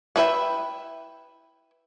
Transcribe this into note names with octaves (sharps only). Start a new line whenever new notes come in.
B3 E4 B4 E5 G5